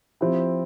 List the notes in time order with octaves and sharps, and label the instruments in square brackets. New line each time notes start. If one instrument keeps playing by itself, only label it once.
[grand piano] F3 C4 E4 G4